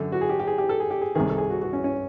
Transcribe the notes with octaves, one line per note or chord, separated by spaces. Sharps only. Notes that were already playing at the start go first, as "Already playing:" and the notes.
Already playing: F#2 D3
F#4
G#4
G4
G4
G#4
G4
A4
G#4
G4
G#4
C2 C3 D#3 G#4
A4
G#4
F#4
F#4
C#4
C#4